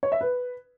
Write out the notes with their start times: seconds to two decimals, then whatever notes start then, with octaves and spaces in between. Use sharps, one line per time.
0.03 C#5
0.12 E5
0.21 B4